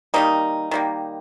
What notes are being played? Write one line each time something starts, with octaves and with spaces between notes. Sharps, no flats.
D#3 G3 A#3 D#4
D#3 G3 A#3